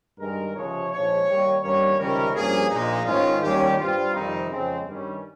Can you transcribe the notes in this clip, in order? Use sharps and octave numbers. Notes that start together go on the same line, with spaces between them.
G2 D#3 G#3 A#4
C#2 C3 F3 G#3 C#5
A#1 G#2 F3 G#3 C#5
D#2 D#3 G3 A#3
G2 D#3 G3 A#3 C#4 C#5
C#2 C3 D#3 G3 C#4 A#4
G2 F3 A#3 C#4 G#4
A#1 A#2 G#3 D#4
G#2 D#3 G#3 C#4 F4
D#2 D#3 G3 C#4 G4
G2 G3 C4 F4
F2 C3 D#3 G3 C4 D#4
F2 C#3 G#3 C4
G2 D#3 G3 C#4